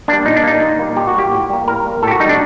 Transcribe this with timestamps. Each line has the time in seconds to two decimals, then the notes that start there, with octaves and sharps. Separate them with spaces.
0.08 G3 A#3 D4
0.26 A#2 D#4
0.37 D4
0.43 G3 A#3 D#4
0.61 A#2
0.79 G3 A#3
0.97 A#2 G4
1.08 F#4
1.14 G3 A#3 G4
1.32 A2
1.50 G3 A#3
1.68 A2 A#4
1.85 G3 A#3
2.03 A2 A4
2.07 G4
2.11 F#4
2.20 G3 A#3 D#4
2.29 D4